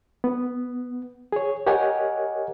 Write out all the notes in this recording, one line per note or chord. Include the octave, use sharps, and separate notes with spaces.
B3
G#4 C#5
G4 A#4 C#5 D#5 F#5 G#5